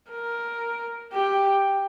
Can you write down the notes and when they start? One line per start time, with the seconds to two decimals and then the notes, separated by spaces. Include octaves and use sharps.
0.10 A#4
1.13 G4